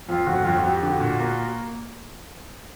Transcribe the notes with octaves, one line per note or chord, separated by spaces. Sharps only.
F2 F4
G1 F#4
F2 F4
F2 F#4
G4
D3
F#4
A#2
A#3